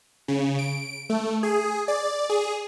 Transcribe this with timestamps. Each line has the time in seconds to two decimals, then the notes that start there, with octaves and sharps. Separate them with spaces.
0.28 C#3
0.59 D7
1.10 A3
1.43 G#4
1.88 D5
2.30 G#4